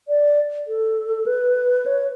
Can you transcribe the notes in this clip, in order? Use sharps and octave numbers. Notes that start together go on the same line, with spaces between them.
D5
A4
B4
C#5